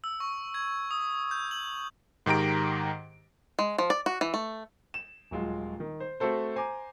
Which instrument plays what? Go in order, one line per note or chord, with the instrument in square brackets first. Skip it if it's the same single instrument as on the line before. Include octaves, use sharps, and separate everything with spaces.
[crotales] E6
C#6
G#6
D#6
G6
F#7
[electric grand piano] G#2 D#3 G4 A#5 D7
[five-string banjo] G#3
F3
D5
F#4
E3
A3
[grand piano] E7
D#1 F#3 G#3 F4
D#3
C5
A3 C4 F#4 A4 C5
C5 G#5 A#5 D6